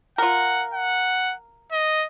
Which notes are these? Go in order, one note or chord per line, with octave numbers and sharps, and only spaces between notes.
F4 A#4 F#5
F#5
D#5